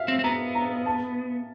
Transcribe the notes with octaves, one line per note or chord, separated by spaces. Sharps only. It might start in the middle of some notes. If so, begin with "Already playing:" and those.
Already playing: E5 F5
C4
C4
B3 A#5
A#5
A5